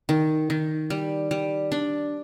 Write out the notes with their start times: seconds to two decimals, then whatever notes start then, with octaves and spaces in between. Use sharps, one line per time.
0.09 D#3
0.50 D#3
0.90 G3
1.31 G3
1.72 D4